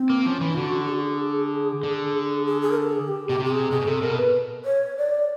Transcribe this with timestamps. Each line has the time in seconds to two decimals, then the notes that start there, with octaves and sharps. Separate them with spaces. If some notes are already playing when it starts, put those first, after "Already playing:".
Already playing: C4
0.10 A#3
0.26 F3 C#4
0.41 E3
0.57 D3 F#4
0.89 G#4
1.83 D3
2.46 G#4
2.62 G#4
2.71 A#4
2.77 A4
2.93 G#4
3.08 G4
3.29 B2 G4
3.40 C3
3.45 G4
3.51 G#4
3.71 B2 G#4
3.81 B2
3.87 C3 A4
4.02 B2 A#4
4.18 B4
4.65 C#5
4.97 D5